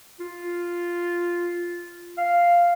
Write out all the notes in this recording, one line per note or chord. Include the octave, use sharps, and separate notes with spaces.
F4
F5